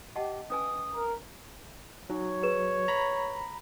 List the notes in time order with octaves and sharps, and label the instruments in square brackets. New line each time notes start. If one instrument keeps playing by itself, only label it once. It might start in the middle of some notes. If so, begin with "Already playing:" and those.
[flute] G4 [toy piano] D#5 F#5 A5
[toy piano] C#4 B4 G#5 [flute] D#6
[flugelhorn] A#4
[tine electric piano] F#3 [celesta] D#4 [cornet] C#5
[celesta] G#4 B4 E7
[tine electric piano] A#5 B5